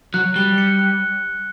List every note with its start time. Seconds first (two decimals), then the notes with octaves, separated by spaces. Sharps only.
0.14 F#3 F#6
0.36 G3 G7
0.58 C#7
0.79 F#6